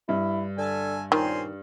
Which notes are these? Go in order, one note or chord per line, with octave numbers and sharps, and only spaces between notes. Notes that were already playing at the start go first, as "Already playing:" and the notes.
G2 E4
D3 E5 G#5 A5
A#2 D#3 C4 C#4 C6